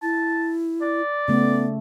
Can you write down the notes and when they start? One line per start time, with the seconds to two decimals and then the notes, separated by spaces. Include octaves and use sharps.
0.03 E4 A5
0.82 D5
1.28 C#3 A3 B3